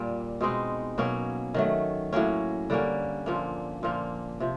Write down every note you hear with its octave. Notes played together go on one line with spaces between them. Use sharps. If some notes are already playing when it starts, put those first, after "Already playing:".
Already playing: A#2 G3 A#3
B2 G#3 C4 D#4
B2 F#3 A#3 C#4
D#3 F#3 A3
A2 F#3 A#3 C#4
D3 G3 A#3 C#4
A#2 F3 A#3
A#2 F3 A#3
C3 F3